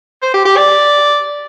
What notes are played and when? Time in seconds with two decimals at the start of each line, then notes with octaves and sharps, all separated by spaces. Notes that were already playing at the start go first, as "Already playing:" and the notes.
0.23 C5
0.34 G4
0.45 G4
0.57 D5